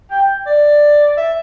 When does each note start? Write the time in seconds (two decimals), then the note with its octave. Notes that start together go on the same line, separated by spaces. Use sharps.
0.11 G5
0.46 D5
1.17 E5